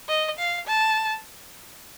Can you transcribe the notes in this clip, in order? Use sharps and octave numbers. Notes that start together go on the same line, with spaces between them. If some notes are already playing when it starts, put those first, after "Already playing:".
D#5
F5
A5